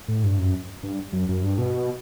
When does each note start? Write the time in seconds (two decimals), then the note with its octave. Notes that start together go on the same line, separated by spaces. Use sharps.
0.08 A2
0.24 G2
0.39 F#2
0.83 G2
1.13 F#2
1.29 F#2
1.44 G2
1.58 B2